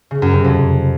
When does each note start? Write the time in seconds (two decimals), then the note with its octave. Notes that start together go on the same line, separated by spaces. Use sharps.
0.11 C#3
0.22 F#2
0.33 C3
0.44 F2